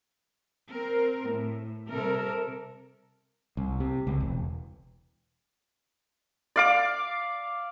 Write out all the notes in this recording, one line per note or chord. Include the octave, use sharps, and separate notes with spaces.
C4 A#4
A2
C3 G3 A4 A#4
C2
C3
C#2
E1
D5 F5 D6